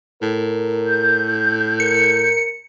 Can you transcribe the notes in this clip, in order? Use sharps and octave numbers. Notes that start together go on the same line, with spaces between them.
A2 A#4
G6
A#4 C#7